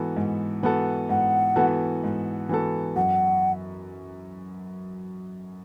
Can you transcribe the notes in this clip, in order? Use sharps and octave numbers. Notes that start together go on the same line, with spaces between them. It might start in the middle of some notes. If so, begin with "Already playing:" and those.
Already playing: G#2 E3 B3 F#4 A4
G#2
E3 B3 F#4 A4
G#2 F#5
E3 B3 F#4 A4
G#2
E3 B3 F#4 A4
F#2 F#5